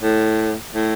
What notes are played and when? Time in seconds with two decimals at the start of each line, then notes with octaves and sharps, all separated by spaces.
0.02 A2
0.75 A2